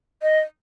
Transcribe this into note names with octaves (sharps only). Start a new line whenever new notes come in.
D#5